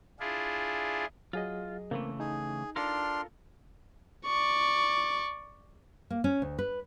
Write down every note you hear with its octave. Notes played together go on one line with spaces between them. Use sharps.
D4 E4 F4 G#4
F#3 F4 G#4 D#5
C#3 E3 A3 A#3 C4
D#4 G#4
D4 F4 A4 A#4 C6 F6
D5 C#6
A#3
C#4
D2
B4